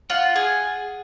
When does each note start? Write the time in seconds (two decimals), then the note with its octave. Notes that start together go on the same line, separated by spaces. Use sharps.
0.10 F4 F#5
0.36 G#4